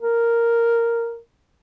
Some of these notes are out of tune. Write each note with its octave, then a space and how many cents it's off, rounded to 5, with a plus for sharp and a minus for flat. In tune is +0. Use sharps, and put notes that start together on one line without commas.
A#4 -5